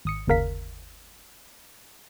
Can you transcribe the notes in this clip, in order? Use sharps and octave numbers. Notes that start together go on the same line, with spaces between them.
G#1 D#6 C#7
G1 D#2 C#3 A#4 F5 B6